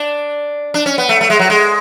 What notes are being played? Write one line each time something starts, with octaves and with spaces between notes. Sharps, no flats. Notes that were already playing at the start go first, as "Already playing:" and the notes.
Already playing: D4
D4
C#4
B3
A3
A3
G#3
F#3
G#3